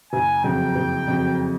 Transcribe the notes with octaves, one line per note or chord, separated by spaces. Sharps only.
F#1 G#5
F2 C#3 F#3 G5
F#1
F2 C#3 F#3